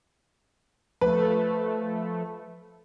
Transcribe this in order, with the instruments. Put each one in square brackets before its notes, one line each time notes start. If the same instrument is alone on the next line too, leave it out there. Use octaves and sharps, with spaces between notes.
[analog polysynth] F3 A3 [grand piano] B4